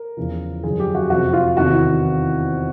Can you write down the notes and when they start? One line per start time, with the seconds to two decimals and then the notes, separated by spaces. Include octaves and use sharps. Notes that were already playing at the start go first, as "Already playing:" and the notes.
Already playing: A#4
0.17 E2 C#3 F3
0.64 F#2 D3 F3 G#4
0.80 G4
0.95 F#4
1.10 F2 C3 F3 F#4
1.33 F4
1.57 E2 C3 D#3 F#4
1.72 E4